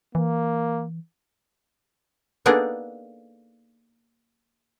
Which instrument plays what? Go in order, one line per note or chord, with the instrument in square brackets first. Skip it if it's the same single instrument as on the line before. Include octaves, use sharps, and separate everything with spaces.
[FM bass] E3 [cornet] A#3
[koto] A#3 B3 D4 D#4 G#4 A4